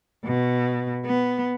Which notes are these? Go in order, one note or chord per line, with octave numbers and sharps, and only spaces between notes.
B2
B3